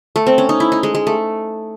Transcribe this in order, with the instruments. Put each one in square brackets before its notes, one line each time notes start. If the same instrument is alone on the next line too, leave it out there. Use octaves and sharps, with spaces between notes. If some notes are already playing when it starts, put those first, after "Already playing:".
[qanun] A3
C4
C#4
D#4
E4
D#4
G#3
G#3
A3